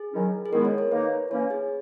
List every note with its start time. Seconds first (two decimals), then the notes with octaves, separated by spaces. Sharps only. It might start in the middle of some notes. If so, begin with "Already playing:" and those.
Already playing: G#4
0.13 D#3 F#3 C#4 E4
0.46 G#4
0.52 D#3 G#3 B3 E4 A#4
0.65 C#5
0.78 C#5
0.91 D#3 A#3 D#4 B4
1.30 E3 A#3 C#4 C#5
1.50 G#4